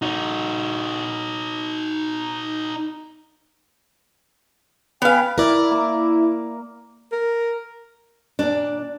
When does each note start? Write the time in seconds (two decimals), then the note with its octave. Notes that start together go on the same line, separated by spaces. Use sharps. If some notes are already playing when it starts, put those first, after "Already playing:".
0.02 D#4 F#4
5.02 B3 B4 F5 G5 G#5
5.38 E4 A#4 D5
5.71 A#3
7.12 A#4
8.39 D#2 A#2 D4 D5